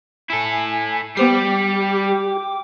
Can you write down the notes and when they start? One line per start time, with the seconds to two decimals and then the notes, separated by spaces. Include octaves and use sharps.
0.30 E4 A4 G#5
1.17 G3 B3 G4 C5 G5 D6 C7